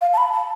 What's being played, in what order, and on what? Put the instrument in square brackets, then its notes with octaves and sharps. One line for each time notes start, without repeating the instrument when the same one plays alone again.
[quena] F5
A5
B5
A5